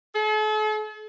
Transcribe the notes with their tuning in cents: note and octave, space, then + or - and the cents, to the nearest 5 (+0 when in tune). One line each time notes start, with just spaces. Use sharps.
A4 -45